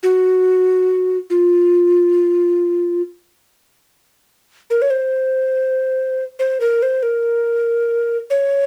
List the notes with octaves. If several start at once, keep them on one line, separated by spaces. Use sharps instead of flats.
F#4
F4
A#4
C#5
C5
C5
A#4
C5
A#4
C#5